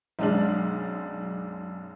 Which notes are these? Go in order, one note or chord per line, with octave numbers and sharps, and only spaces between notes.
B1 F#2 G#3 D4 F6 F#7